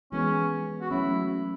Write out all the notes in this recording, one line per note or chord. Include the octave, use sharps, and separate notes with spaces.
E3 G#3 B3 C#4
F#4
F#3 A3 C#4 E4